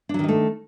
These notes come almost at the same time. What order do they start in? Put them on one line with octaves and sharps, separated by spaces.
D4 F#3 D#3 D#4 A3